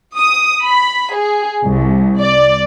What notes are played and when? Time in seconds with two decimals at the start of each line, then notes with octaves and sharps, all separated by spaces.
0.17 D#6
0.62 B5
1.16 G#4
1.66 C2
2.21 D5